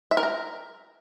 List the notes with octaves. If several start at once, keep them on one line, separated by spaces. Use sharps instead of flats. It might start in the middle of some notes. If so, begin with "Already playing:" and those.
E5
A#4
A#5